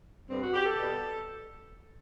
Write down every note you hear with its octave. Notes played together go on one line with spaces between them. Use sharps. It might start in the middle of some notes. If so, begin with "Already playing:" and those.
G2 D3 G3 B3 C4
F#4
G4
A4
B2 G3 B3